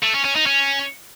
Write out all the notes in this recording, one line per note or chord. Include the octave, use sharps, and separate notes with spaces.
A3
C#4
C#4
D#4
C#4